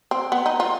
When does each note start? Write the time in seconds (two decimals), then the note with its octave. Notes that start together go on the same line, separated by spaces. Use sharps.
0.11 C4
0.32 B3
0.46 D#4
0.60 F4